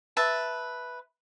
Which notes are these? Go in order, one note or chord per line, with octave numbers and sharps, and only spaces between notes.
B4 E5 A5